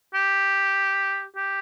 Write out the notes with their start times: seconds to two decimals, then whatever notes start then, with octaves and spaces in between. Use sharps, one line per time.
0.14 G4
1.37 G4